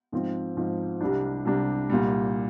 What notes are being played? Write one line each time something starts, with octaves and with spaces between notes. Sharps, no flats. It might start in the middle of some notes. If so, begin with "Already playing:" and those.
G#2 F3 C4
G#2 F3 C4
C2 C3 G3 D4
C2 C3 G3 D4
C2 A#2 G3